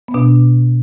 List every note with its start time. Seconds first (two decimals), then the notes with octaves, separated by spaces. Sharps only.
0.08 B3
0.14 B2 D4